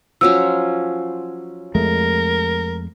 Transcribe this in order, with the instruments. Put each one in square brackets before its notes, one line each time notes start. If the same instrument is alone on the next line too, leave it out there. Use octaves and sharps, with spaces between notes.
[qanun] F3 F#3 C#4 [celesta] E6
[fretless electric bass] F2 G#3 A3 [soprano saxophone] A#4